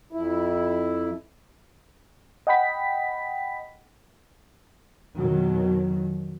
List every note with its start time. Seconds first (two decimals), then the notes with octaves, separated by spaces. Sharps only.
0.13 F2 E4
2.47 D#5 F#5 G5 B5 B6
5.17 F2 B2 D#3 F#3